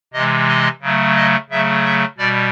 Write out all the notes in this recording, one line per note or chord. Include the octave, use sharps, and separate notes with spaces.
C3 E3 G#3 D#5
D#5
C#3 F#3 A3
D#5
C#3 F#3 A3 E5
E5
B2 G3 D5